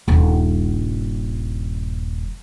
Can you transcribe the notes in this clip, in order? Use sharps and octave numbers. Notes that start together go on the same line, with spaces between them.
D#1 G2